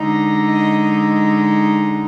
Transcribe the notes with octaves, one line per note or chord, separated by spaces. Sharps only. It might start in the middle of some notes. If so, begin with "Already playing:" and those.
Already playing: D3 G#3 D#4
D#5